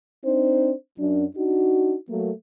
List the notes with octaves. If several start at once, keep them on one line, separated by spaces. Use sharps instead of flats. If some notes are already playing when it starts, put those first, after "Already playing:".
C4 D4 D#4 C5
F#2 D4
D4 D#4 F#4
F#3 A3 A#3